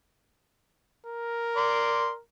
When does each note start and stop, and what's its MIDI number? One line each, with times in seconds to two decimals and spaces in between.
1.06 2.21 70
1.57 2.10 74
1.57 2.10 84